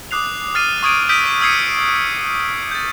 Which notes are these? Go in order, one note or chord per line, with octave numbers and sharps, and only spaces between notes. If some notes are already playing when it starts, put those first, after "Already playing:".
D6 D#6 F#6 C7 F7
D6 F6 A6 C7 D#7
C#6 D#6 G#6 D7 D#7
D#6 E6 G6 B6 D7 D#7
D#6 E6 G#6 C7 C#7 D#7
G6 A6